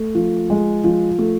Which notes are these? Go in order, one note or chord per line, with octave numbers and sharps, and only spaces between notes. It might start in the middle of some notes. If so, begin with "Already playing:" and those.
Already playing: A3
F3
G#3
F3
A3